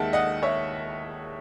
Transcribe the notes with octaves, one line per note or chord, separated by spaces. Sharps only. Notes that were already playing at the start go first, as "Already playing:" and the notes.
Already playing: D#2 D#3 G#3 E5 F#5 A5
D#5 F#5
C#5 E5